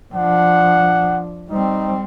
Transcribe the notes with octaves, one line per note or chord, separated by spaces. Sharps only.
F3 D4 F#5
G3 C4 D#4